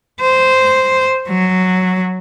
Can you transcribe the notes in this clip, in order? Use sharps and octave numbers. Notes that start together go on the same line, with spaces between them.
C5
F#3